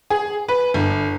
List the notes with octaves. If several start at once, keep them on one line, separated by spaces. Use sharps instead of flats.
G#4
B4
G1